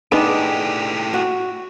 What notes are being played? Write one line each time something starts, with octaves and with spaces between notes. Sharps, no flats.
A2 B3 D4 D#4 G4 G#4
F#4